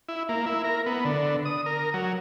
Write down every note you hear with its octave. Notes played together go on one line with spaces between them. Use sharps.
E4
A#3
E4
A#4
B3
D3
D#6
A#4
F#3